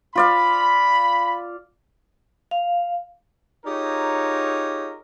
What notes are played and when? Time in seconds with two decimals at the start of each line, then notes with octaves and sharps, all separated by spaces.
0.16 F4 D5 F5 B5
2.51 F5
3.65 D#4 F4 G4 G#4 A#4 C#5